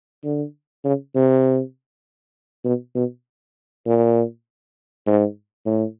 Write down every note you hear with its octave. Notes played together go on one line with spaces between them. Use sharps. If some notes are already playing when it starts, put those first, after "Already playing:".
D3
C#3
C3
B2
B2
A#2
G#2
A2